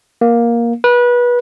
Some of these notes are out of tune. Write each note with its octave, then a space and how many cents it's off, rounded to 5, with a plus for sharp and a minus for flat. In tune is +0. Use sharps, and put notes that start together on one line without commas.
A#3 +10
B4 -25